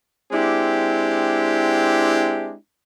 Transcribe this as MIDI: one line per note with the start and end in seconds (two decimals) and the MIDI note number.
0.32 2.54 56
0.32 2.54 60
0.32 2.54 62
0.32 2.54 64
0.32 2.54 67